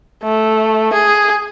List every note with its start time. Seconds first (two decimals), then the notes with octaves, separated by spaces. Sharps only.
0.23 A3
0.93 G#4